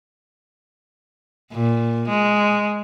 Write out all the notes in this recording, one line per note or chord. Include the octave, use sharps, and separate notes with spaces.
A#2
G#3